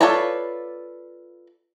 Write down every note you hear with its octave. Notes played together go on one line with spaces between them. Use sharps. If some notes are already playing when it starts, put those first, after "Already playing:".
F4 A4 B4 C#5 D5